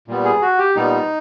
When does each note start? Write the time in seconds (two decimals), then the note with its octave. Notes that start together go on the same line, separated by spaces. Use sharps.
0.08 A#2 G3 B3
0.25 G#4
0.42 F#4
0.58 G4
0.76 A#2 G3 B3 D#4